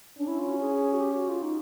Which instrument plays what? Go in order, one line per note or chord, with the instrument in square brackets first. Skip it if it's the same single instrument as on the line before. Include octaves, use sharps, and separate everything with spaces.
[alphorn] C#4 [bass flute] D4
[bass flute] E4
F4
F#4
G#4
F#4
G4
F#4
F4
D#4